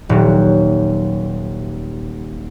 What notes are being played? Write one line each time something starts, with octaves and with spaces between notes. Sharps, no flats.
D#1 F#3